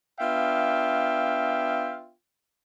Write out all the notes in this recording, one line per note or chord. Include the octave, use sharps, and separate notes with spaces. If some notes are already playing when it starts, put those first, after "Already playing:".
B3 D4 F4 E5 F5 G5